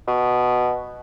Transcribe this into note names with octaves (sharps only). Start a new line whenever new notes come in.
B2